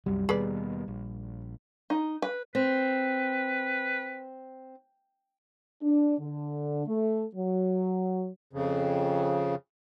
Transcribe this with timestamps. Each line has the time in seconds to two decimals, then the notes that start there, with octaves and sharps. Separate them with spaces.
0.06 C2 F#2 G3
0.29 D#2 B2 G#4 B4 D5
0.88 A#1
1.90 D#4
2.22 B4
2.55 C4 B4
5.82 D4
6.18 D3
6.87 A3
7.35 F#3
8.53 F2 C#3